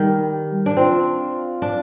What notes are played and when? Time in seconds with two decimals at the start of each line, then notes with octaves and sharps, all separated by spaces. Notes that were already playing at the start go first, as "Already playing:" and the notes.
Already playing: D#3 G3
0.66 D4
0.77 C4 F4
1.62 D4